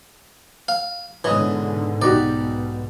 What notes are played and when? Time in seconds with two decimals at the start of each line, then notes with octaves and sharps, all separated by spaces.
0.68 F5
1.24 G#2 B2 D3 E3 C#5 D#5 D#6
2.02 B1 G#2 B2 D#4 F#4 G4 D5